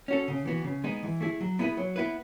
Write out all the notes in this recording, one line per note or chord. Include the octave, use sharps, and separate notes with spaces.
C#4 F#4 A4
C#3
E3 B3 F#4
C#3
G#3 B3 D#4
E3
A3 E4 G#4
F#3
B3 E4 G#4 B4
F#3
B3 E4 B4